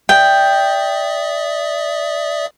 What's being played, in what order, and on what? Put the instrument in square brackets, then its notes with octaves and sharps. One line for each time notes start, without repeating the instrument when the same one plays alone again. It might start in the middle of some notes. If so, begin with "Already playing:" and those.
[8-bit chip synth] D5 E5 D#6 [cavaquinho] G5